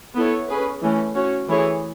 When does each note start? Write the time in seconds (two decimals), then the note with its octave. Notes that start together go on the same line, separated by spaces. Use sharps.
0.15 B3 E4 A4 C#5
0.48 C#4 G#4 B4
0.82 E3 A3 C#4
1.15 C#4 F#4 C#5
1.48 E3 A3 E4 G#4 C#5